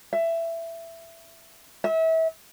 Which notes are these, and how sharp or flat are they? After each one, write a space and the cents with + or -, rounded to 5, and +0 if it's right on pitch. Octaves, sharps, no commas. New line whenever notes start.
E5 +15
E5 -30